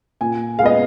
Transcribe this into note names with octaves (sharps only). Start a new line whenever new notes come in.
A#2 G#5
G#3 B3 D#5 F5